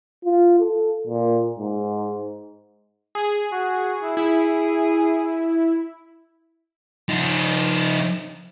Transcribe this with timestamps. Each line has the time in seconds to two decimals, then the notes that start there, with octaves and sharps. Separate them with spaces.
0.24 F4
0.59 A4
1.07 A#2
1.59 G#2
3.15 G#4
3.52 F#4
4.03 E4
4.17 E4 G#4
7.09 F3 D#4